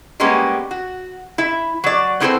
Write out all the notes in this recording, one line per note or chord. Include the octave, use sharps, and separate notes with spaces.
G3 G#3 A#3 B3 C#4 G4
F#4
E4 E5
F#3 D5
B3 C4 E4 F#4 A4 C5